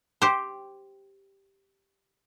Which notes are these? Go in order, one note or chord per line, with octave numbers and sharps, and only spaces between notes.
G4 C5